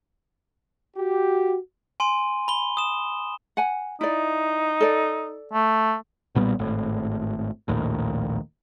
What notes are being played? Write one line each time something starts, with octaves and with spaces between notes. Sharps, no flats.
F#4 G4
G#5 C6 D#7
B5 G7
D#6 E7
F#5 G#5
D#4 E4 D5
A4 D5
A3
B1 A#2 G3 B3
G#1 A2
A#1 D#2 A2